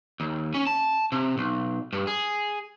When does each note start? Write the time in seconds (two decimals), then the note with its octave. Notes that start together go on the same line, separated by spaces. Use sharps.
0.20 D#2
0.54 C#4
0.67 A5
1.12 C3
1.38 B1
1.93 G2
2.07 G#4